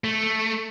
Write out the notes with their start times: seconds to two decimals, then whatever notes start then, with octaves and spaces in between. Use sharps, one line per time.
0.04 A3